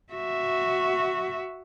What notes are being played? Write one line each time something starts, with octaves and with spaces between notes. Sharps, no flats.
F#4 E5